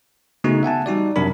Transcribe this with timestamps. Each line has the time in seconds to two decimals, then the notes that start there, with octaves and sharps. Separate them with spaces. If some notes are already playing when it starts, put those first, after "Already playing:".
0.44 C#3 A3 B3 D#4 F#4
0.63 E5 F#5 G#5 A5
0.86 G3 D#4 F#4 D5
1.16 F#2 C3 F#3 D4 A#4 B5